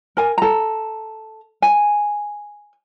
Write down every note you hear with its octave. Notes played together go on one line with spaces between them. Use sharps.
A#4 G#5
A4 A#5
G#5